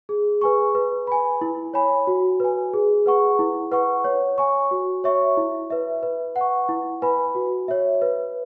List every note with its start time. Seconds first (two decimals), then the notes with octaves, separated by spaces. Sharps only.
0.09 G#4
0.41 B4 G#5 C#6
0.75 B4
1.07 G#5 B5
1.41 E4
1.74 C#5 G#5 B5
2.07 F#4
2.40 B4 G#5
2.74 G#4
3.06 B4 F#5 C#6
3.39 E4
3.72 B4 F#5 C#6
4.04 C#5
4.38 G#5 C#6
4.71 F#4
5.04 C#5 E5 C#6
5.37 E4
5.70 B4 E5
6.03 B4
6.36 F#5
6.41 C#6
6.69 E4
7.02 B4 G#5 B5
7.35 F#4
7.68 C#5 E5
8.02 B4